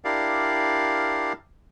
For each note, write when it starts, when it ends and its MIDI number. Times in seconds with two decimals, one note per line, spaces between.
0.05 1.33 62
0.05 1.33 64
0.05 1.33 67
0.05 1.33 70
0.05 1.33 74
0.05 1.33 77